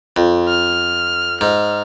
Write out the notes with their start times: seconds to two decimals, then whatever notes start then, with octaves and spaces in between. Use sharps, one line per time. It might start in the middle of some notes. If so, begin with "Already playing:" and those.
0.16 F2
0.49 F6
1.41 G#2 F6